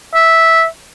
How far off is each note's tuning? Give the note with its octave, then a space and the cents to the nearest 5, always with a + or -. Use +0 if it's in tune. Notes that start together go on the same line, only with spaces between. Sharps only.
E5 -10